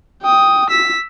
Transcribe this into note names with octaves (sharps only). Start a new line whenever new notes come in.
G5 D#6
E6 B6